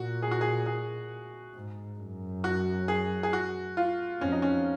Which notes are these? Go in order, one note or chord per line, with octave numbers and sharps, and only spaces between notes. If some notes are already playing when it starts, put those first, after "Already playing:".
Already playing: A#2 F#4
G#4
F#4
G#4
G#4
G#2
F#2
F#4
G#4
G#4
F#4
F4
F2 C#4
D#4
C#4